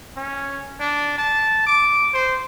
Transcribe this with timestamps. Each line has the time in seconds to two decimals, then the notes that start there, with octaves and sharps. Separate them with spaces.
0.16 C#4
0.80 D4
1.18 A5
1.66 D6
2.14 C5